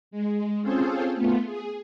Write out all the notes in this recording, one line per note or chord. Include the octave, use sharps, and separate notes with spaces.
G#3
C4 C#4 F4 G#4 A4 C5
A3 B3 F4
G#4